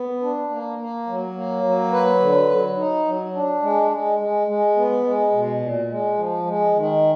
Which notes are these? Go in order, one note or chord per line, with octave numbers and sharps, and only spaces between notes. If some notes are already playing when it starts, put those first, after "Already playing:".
Already playing: B3
D4
A#3
A#3
F#3
A#3
F#3
B4
D3
F#3
D#4
F#3
D4
G#3
G#3
G#3
G#3
B3
G#3
B2
A#2
G#3
F3
G#3
D#3